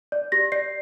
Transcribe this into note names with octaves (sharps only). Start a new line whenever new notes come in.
D5
G4 A#6
D5 C7